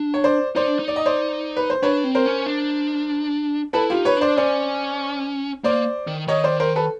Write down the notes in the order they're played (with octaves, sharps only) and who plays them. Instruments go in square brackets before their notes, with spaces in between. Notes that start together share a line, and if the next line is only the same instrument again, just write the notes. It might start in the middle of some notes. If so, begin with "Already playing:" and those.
Already playing: [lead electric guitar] D4
[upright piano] C#5
C5 D5
[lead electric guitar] D#4 [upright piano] C5 D5
[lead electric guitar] D4
D#4
[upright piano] D5
D#5
C5 D5
B4
C5
[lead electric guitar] D4 [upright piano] B4 C#5
[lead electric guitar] C4
[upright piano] A#4 C5
[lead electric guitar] C#4
D4
[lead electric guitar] E4 [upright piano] A4 B4
[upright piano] F4 G4
[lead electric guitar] D#4
[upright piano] B4 C#5
[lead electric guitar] D4 [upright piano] C5 D5
[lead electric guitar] C#4 [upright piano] C5 D5
[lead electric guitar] A#3 [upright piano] C5 D5
[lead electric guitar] D#3
[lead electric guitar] D#3 [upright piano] C#5 D#5
[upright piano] C5 D5
A#4 C5
A4 B4